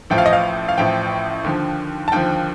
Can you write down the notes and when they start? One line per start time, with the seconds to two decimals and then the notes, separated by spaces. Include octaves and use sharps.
0.10 A1 A2 F3 G5
0.18 F5
0.26 D#5
0.33 F5
0.68 F5
0.78 A1 A2 F3 G5
1.44 D#2 D3 F3
2.08 A5
2.12 D#2 D3 F3 G5